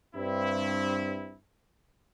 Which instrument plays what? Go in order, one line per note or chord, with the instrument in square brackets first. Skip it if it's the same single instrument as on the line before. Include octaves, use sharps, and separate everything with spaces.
[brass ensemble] G2 C4 E4